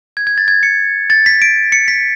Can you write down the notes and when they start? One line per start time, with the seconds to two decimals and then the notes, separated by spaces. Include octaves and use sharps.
0.17 G#6
0.27 G#6
0.38 A6
0.48 G#6
0.63 C#7
1.10 A6
1.26 B6
1.42 D7
1.72 C#7
1.88 B6